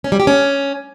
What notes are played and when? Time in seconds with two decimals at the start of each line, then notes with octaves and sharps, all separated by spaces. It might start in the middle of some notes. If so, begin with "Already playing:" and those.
0.04 C#4
0.12 G3
0.20 G4
0.27 C#4